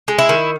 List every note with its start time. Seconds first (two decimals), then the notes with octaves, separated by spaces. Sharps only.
0.08 G#3
0.19 E4
0.29 D#3